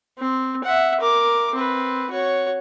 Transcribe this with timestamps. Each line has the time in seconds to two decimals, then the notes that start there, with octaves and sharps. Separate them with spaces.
0.18 C4
0.64 E5 F#5
1.00 A#4 D6
1.55 C4 B4
2.11 F#4 C#5